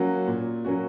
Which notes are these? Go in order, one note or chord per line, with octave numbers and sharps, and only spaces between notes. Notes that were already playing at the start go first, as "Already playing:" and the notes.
Already playing: F#3 A#3 C#4 F#4
A#2
F#3 A#3 C#4 F#4